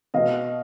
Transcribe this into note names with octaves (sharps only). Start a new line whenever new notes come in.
B2 D#5 F5